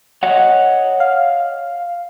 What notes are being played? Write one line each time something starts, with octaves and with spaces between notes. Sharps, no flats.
C#5 D#5 F#5
F5